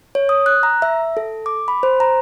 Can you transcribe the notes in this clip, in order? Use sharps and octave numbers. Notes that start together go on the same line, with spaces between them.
C#5
D#6
F#6
A#5
E5
A4
D6
B5
C5
A#5